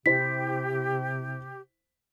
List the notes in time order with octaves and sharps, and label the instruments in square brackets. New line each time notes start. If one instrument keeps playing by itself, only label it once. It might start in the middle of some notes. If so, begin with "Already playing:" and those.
[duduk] C3 [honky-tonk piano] E4 C5 [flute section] G4 [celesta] B6